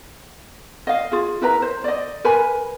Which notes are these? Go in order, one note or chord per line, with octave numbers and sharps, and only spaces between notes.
D#5 F5
F4 G#4
E4 A#4 B4 A#5
C5
D5 D#5
A#4 B4 G#5 B5